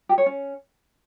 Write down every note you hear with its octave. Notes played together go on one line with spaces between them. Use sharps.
G4
C#5
C#4